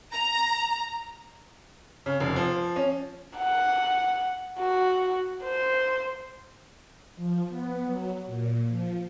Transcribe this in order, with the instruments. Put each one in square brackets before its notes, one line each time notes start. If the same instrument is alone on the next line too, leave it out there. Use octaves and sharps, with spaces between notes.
[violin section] A#5
[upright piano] C#3
F1
F3
C#4
[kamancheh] F#5
F#4
C5
[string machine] F3
B3
F#3
A#2
F3